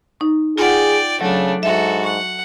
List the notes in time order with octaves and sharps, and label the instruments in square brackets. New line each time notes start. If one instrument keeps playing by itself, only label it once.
[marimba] D#4 C#6
[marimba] F4 F#5 [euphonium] G#4 [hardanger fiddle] D5 G5
[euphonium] C#3 [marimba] F#3 [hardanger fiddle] A3 D4
[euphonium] G#2 [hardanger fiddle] F#4 A4 [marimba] E5
[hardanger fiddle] F#5 [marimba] C#6